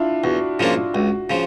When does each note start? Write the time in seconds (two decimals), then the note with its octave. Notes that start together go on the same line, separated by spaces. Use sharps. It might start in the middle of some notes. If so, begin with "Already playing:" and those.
Already playing: D4 E4 F4
0.24 E2 F#4
0.59 C#3 F3 A#3 D4 F4
0.94 C#2 F#4
1.30 C#3 F3